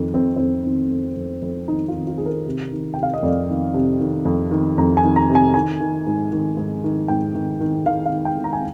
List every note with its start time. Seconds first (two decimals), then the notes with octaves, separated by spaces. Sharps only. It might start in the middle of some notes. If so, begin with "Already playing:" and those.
Already playing: F2 D#3
0.14 F2 C4
0.37 F2 C4
0.65 D#3
0.92 F2
1.16 F2
1.42 F2
1.68 D#3 D#4
1.88 F4
1.94 D#3
2.07 F4
2.17 D#3 G#4
2.26 A#4
2.46 C3
2.72 D#3
2.94 C3 G5
3.03 F5
3.14 D#5
3.23 F2 D5
3.49 D#3
3.74 C3
4.00 D#3
4.25 F2
4.51 D#3
4.78 F2 A#5
4.97 G#5
5.04 D#3
5.16 A#5
5.29 C3
5.35 G#5
5.54 D#3 G#5
5.81 D#3
6.07 G#2
6.32 D#3
6.57 G#2
6.84 D#3
7.08 G#2 G5
7.35 D#3
7.60 D#3
7.86 D#3 F5
8.06 F5
8.12 D#3
8.25 G5
8.38 D#3
8.44 A#5
8.53 G#5